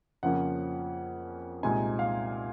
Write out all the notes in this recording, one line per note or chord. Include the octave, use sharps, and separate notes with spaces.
F2 C#3 F3 A#3 C#4 F#5
C2 A#2 G#3 C4 D#4 G#5
F5